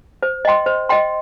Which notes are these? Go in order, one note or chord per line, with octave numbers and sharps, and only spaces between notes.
C5
D#5 G5 C6
C5
D#5 G5 C6